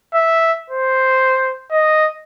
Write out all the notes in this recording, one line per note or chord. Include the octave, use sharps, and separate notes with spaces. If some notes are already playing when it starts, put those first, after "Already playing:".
E5
C5
D#5